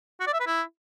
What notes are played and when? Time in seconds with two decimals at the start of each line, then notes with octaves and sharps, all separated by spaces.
0.20 F#4
0.27 D5
0.33 E5
0.40 B4
0.47 E4